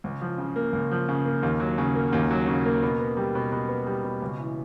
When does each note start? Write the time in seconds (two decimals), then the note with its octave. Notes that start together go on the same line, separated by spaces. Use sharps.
0.04 C#2
0.22 F3
0.38 C#3
0.56 A#3
0.73 C#2
0.91 F3
1.08 C#3
1.26 A#3
1.43 D#2
1.60 F#3
1.78 C#3
1.95 A#3
2.13 D#2
2.31 F#3
2.47 C#3
2.65 A#3
2.82 B2
3.00 B3
3.17 G3
3.35 B2
3.52 B2
3.69 B3
3.87 G3
4.04 B2
4.22 C#2
4.39 E3